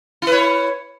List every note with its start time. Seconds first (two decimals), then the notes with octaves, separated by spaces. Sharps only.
0.22 E4
0.27 B4
0.32 C#5